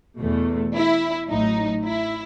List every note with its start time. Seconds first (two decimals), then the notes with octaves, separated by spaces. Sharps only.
0.20 E2 B2 A3
0.75 E4
1.29 A1 A2 F#3 D#4
1.84 E4